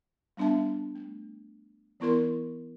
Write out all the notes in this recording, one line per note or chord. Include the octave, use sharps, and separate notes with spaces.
G3 B3 D4 E5 A5
A3
E3 B3 E4 A#4 C6